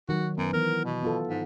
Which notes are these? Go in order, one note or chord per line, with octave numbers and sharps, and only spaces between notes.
D#3 F#3 F#4
F#2 B3
E3 B3 A#4
B2
B3 F4 A4
G#2